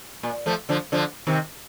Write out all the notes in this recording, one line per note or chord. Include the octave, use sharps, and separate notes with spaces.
A#2
F3 A3
D3 F3
D3 F3
C3 D#3